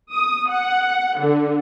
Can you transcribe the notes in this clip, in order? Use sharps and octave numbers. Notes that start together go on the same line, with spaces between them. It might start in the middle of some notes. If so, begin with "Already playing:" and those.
D#6
F#5
D3